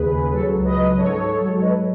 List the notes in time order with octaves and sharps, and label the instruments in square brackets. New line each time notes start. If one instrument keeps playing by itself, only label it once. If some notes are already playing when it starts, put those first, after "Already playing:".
Already playing: [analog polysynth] D#2 C#3 G#4 B4
D#2
F#3 A4 C#5
C#2
B4 D#5
F#3
G#2 A4 C#5
G#2
A4 C#5
F#3
F#3 B4 D#5